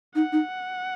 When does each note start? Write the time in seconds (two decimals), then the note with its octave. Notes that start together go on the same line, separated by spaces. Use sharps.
0.15 D#4 F#5
0.32 D#4